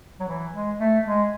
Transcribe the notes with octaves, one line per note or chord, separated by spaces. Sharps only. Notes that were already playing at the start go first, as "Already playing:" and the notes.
F#3
E3
G#3
A3
G#3